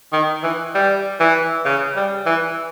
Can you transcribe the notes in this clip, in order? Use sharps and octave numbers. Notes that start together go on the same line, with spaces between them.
D#3
E3
G3
E3
C#3
G3
E3